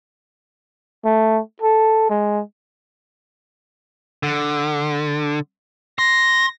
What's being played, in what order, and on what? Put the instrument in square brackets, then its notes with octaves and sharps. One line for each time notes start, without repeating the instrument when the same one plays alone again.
[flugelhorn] A3
A4
G#3
[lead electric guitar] D3
[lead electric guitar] C6 [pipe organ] A#6